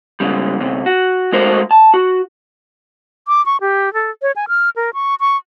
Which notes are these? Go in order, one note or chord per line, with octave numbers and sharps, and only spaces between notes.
G#2 C#3 G3
D2 C3
F#4
G#3 A3 F#4 A#4 C5
A5
F#4
D6
C#6
G4
A4
C#5
G#5
F6
A#4
C#6
C#6